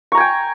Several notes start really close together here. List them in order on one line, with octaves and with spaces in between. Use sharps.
C#6 A#5 G#5 G5